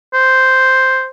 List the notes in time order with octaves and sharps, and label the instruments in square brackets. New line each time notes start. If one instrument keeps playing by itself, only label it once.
[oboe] C5